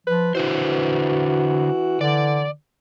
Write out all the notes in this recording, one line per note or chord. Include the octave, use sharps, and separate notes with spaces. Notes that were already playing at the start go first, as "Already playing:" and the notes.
F3 B4
D3 E3 F#4 B4 C5
D3 D5